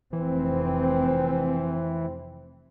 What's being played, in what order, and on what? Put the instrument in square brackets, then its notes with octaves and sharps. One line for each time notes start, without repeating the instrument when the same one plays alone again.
[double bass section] F1 C4 [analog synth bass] E3